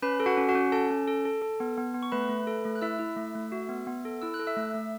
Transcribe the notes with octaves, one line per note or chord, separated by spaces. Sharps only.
C#4 B4 B5
A4
F#4 F#5
C#4
F#4 F#5
C#4
A4 A5
C#4
A4
A4
A4
B3
B3
B3
C#6
A3 B4 B5
A3
A4
A3
F#6
E4 E5 E6
E4
A3
A3
F#4
B3
B3
A4
E4 E6
F#6
A4
E5 E6
A3
A3